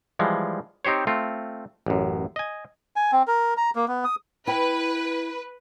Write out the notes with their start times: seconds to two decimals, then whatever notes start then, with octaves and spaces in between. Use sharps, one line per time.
0.19 E3 F3 G3 G#3
0.85 C4 D#4 G4 C5 C#5
1.07 A3 C4 F4
1.86 A1 F#2
2.36 D#5 G#5
2.96 G#5
3.12 C4
3.28 A#4
3.57 A#5
3.76 A#3
3.88 B3
4.05 D#6
4.47 E4 B4 G5